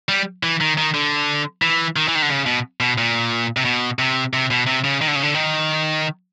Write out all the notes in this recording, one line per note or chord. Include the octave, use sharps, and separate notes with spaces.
G3
E3
D#3
D#3
D3
E3
D#3
E3
D#3
D3
C#3
B2
B2
A#2
C3
B2
C3
C3
B2
C3
C#3
D#3
D3
C#3
D3
D#3